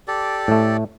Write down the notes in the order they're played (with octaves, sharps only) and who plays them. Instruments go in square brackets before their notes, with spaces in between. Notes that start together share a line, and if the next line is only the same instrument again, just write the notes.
[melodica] G4 A4 D5
[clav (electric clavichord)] A2 A3